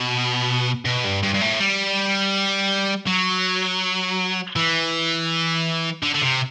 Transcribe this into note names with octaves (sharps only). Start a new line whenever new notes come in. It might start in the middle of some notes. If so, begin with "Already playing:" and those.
Already playing: B2
B2
G2
G2
G2
A2
G3
F#3
E3
D3
D3
C3